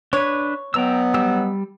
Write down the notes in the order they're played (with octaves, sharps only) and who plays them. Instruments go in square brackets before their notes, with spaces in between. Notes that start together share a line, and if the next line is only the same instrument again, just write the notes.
[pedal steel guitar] D4 B4 [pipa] C#5
[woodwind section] B2 F#3 B3 [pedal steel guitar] G5 A#5 E6
[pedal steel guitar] G3 E6 [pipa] G4